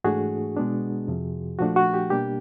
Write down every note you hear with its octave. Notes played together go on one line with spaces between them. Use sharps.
G#2 E3 A3 D4 F#4 G#4
B2 G#3 B3 D4
F2 C3 F3
A#2 F3 A3 D4 F#4
F#4
G4
B2 G3 A#3 D4 G4